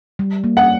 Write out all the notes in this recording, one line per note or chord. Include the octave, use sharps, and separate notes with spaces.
G3
A#3
F#5